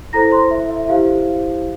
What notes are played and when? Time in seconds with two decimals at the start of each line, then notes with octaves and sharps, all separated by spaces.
0.13 E4 A4 C5 A#5 A#6
0.31 C5 C6
0.51 E5
0.70 E5
0.88 E4 G4 C5 F5